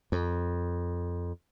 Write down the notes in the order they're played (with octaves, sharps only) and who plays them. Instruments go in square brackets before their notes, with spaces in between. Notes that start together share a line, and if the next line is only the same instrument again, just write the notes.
[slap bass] F2